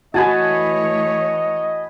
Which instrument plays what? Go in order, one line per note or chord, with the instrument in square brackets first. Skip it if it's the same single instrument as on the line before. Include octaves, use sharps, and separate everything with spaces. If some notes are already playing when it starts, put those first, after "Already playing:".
[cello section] E3 A3 C#5 [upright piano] F#4 [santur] B4 G#5 A5 [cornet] D#5